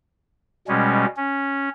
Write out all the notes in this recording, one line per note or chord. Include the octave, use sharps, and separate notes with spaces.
B2 G3 G#3 C#4
C#4